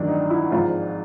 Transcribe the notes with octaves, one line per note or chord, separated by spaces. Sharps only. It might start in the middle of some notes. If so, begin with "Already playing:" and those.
Already playing: A1 G2 D#3 F#3 D4
D#4
E4
G#1 G#2 F3 F4